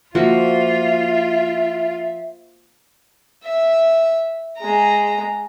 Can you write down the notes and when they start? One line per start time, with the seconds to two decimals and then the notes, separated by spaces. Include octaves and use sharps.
0.15 F3 A#3 F4 F#4 E5
3.44 E5
4.59 G#3 A#5